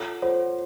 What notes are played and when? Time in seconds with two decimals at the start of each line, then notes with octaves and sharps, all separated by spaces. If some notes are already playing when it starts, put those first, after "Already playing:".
Already playing: F4 A4 C#5 F#5
0.22 F4 A4 C5 C#5 F#5